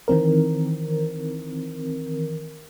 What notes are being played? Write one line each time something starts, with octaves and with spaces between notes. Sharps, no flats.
D#3 E3 C4 A#4